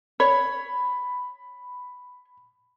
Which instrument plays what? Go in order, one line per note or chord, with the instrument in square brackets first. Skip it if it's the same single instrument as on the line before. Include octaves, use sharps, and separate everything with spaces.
[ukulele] C#5 [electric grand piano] B5